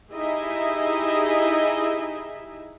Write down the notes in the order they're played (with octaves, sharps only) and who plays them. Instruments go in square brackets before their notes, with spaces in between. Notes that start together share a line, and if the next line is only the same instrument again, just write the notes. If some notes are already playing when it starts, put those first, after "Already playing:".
[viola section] D#4 E4 G4 G#4 D#5 E5